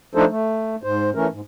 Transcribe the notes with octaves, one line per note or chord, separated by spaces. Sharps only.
F3 A3 D4 D#4 A4 C5
A3
G#2 C5
E3 A3 C#4 A#4
G#2